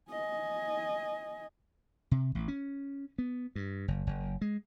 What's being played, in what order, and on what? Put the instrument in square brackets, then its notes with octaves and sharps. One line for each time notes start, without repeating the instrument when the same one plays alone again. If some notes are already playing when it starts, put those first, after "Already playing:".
[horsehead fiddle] D#5 G#5
[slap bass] C3
A1
C#4
B3
G2
F#1
F#1
G#3